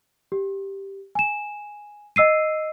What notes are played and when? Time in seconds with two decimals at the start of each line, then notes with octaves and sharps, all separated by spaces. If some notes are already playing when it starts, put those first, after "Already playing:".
0.32 G4
1.15 G#5 E7
2.16 D#5 E6 C7 D#7